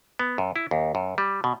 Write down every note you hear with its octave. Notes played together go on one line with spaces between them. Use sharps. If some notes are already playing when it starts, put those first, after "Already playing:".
B3
F#2
E4
D#2
F#2
G3
B2